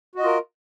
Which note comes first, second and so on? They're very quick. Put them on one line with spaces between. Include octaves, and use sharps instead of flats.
F#4 D#5 F4 A#4